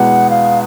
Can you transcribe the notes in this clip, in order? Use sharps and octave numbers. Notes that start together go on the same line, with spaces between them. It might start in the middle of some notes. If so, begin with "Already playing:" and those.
Already playing: E2 B2 G#3 B3 F#5
F5